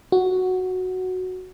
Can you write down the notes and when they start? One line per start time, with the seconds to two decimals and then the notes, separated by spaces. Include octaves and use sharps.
0.12 F#4